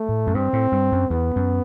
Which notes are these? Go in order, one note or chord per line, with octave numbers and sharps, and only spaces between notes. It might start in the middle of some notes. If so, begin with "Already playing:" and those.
Already playing: A3
A2
F#2
G2 C4
A2
G2
F#2
E2 B3
F#2